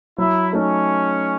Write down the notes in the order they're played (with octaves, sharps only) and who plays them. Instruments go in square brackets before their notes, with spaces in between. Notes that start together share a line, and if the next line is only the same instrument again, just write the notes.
[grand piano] F#3 [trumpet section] E4
[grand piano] A3 D#4 A4 [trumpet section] C#4